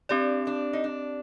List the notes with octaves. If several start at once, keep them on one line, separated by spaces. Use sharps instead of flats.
C4 D4 G4 D5
D4
D#4
D4